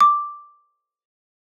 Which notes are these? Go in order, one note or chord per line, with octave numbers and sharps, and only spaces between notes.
D6